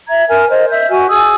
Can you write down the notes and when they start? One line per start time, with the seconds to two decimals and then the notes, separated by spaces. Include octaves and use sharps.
0.08 E5 A#5 G#6
0.28 A#4 G#5
0.49 C5 D#5
0.70 E5 G6
0.89 F#4 G#5
1.09 G#4 G#5 D#6 E6